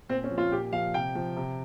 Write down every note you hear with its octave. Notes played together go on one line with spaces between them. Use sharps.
A#2 C4
C#4
F3
F4
A#2 G4
F3 F5
C3 G5
F3
C3